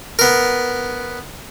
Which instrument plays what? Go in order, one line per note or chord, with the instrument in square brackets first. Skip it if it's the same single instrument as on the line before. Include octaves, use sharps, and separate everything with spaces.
[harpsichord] B3 A#4